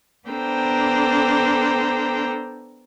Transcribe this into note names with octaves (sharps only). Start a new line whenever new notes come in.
B3 D4 A4 C5 G5 A#5